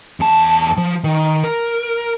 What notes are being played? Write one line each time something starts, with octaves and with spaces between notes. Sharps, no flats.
E2 A5
F3
D#3
A#4